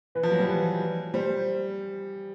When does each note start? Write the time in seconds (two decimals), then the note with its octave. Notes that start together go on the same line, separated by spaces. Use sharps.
0.15 E3 B4
0.23 F3
0.31 F#3
0.39 G3
0.48 E3
1.14 G3 C5